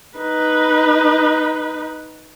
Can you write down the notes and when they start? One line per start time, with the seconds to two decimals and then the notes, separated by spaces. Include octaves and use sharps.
0.18 D#4 B4